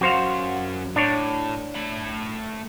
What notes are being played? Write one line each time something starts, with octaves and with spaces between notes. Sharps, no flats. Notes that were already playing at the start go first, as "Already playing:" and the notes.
F#2 F#4 C5 F5
A2 D4 C#5
A3 B5